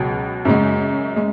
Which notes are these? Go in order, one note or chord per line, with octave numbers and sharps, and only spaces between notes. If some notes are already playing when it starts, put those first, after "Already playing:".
Already playing: C#2 B2 F#3
F#2 C#3 G#3
G#3